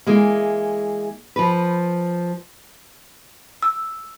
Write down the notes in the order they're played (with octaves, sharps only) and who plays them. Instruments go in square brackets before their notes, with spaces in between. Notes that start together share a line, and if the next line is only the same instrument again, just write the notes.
[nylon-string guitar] E3 G#3 A#3
F3 B4
[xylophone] E6